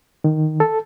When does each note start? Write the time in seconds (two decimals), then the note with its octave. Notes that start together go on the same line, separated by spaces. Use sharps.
0.24 D#3
0.60 A4